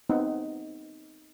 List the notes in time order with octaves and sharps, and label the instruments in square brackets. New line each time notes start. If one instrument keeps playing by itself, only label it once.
[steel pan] B3 C4 D#4 F#5